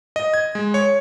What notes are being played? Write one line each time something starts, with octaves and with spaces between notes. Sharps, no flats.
D#5
G#6
G#3
C#5